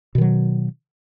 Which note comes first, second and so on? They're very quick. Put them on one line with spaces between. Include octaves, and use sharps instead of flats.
B2 D#3 F#3